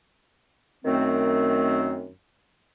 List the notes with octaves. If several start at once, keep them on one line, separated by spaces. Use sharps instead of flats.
F#2 D#3 A3 C4